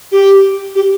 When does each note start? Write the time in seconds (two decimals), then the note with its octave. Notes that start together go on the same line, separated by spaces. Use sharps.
0.12 G4
0.75 G4